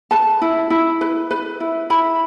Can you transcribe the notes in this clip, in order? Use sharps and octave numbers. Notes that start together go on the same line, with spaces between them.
B4 A5
E4
E4
B4
B4
E4
E4 B5